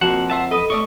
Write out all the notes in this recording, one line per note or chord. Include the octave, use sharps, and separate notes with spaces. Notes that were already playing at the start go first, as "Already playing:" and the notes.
F2 F3 A#3 F#4 F#5 E7 F#7
C5 E5 F#5 A5
A4 B4 D#5 D#6
A3 D5 D#5 C#6